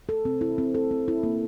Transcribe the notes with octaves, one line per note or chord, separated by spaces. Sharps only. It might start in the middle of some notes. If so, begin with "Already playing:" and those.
A4
C4
E4
C4
A4
C4
E4
A#3